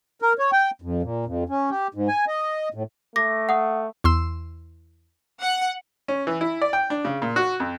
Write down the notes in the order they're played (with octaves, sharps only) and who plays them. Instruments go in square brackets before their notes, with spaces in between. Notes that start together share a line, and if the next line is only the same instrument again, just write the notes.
[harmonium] A#4
C#5
G5
F2
A#2
F2
C#4
G4
G#2
G#5
D#5
A2
[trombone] A3 [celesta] D6 A#6
[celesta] F#5 D#6
[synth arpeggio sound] E2 C6 E6
[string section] F#5
[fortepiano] C#4
E3
E4
D5
G5
D4
C#3
A#2
F#4
F2